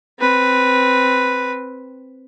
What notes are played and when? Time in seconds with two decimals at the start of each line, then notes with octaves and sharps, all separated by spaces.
0.19 C4 B4